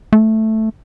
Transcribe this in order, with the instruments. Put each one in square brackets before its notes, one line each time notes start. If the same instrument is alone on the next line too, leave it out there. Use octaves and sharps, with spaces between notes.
[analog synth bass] A3